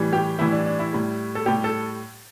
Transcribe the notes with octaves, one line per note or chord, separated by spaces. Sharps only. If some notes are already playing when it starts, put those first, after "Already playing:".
Already playing: A2 E3 G3
G4
A2 E3 G3 E4
D4
D4
E4
A2 G3
A4
A2 G3 G4
A4